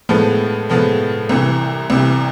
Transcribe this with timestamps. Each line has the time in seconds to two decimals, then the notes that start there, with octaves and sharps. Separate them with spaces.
0.09 A2 F3 G#3 B3
0.69 A2 F3 G#3 B3
1.29 C2 C3 E3
1.90 C2 C3 E3